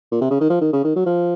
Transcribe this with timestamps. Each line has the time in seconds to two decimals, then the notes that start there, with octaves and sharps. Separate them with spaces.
0.12 A#2
0.21 C3
0.31 C#3
0.41 D#3
0.50 F3
0.61 D#3
0.73 C#3
0.85 D#3
0.96 F#3
1.06 F3